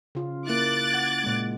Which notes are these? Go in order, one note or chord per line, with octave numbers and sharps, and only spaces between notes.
C#3 F4
A#3 E4 D6 F#6 A6
F#5
A#2 G#3